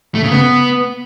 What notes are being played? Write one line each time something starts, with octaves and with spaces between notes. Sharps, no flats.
A3
C#3
B3